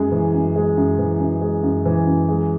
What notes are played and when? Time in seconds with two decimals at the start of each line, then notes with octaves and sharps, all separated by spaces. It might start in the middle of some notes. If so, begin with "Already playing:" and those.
Already playing: F#2 G#3
0.11 E3
0.34 F#2
0.56 G#3
0.77 F#2
0.99 E3
1.20 F#2
1.41 G#3
1.63 F#2
1.85 E3
2.07 F#2
2.29 G#3